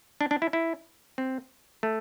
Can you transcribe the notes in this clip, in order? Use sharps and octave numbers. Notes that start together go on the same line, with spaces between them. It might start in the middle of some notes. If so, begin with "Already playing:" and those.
D4
D4
E4
E4
C4
A3